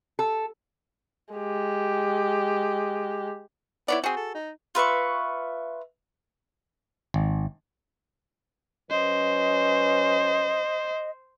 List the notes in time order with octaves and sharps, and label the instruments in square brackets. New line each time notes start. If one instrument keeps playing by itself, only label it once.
[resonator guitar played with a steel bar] A4
[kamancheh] G#3 G4
[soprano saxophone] B3 [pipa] E4 C#5 D5
[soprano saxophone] C4 [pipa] F#4 G#4
[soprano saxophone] A4
D#4
[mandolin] F4 B4 E5 C#6
[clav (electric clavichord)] G#1
[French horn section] F#3 C#4 B4 [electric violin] C5 [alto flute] D#5